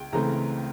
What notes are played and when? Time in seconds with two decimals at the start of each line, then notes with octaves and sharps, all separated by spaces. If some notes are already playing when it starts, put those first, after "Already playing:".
Already playing: C#2 G5
0.13 C#2 C#3 E3 A3 C4 A#5